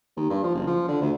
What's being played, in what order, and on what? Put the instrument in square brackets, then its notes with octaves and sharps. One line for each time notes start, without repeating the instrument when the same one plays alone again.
[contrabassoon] D#2
G2
F3
F#1
F3
D3
D2